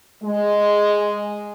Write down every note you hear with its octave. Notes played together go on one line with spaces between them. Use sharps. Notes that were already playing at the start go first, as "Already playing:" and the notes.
G#3